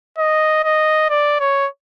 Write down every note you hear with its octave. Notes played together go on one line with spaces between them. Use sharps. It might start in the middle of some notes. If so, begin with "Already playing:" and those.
D#5
D#5
D5
C#5